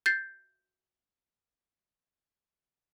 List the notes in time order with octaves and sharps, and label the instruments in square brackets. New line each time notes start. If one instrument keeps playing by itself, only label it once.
[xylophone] G6 A6 C7